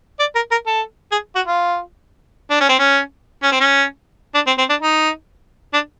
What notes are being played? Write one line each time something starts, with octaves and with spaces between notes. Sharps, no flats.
D5
A#4
A#4
A4
G#4
F#4
F4
D4
C#4
C4
C#4
C#4
C4
C#4
D4
C4
C4
D4
D#4
D4